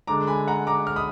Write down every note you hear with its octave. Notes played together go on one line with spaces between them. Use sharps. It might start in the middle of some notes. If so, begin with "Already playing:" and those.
D3 G#3 A#5 D6
G#5 B5
F#5 A#5
A#5 D6
F6
B5 D#6